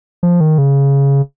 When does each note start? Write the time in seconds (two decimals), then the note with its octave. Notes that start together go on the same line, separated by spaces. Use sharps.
0.23 F3
0.41 D#3
0.58 C#3